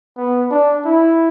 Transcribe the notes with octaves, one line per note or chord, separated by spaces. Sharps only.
B3
D4
E4